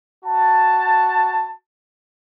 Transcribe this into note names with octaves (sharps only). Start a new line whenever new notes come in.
F#4 A5